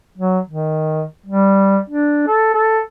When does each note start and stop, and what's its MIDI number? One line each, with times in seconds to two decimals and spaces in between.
0.18 0.39 54
0.48 1.04 51
1.26 1.79 55
1.90 2.23 62
2.27 2.53 69
2.54 2.80 69